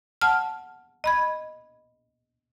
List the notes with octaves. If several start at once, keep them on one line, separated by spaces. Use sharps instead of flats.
F#5 A5 F6
D#5 B5 G#6